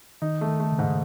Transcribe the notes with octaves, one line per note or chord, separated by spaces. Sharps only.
D#3 D#4
A3
D#3
A3
C#3
G#2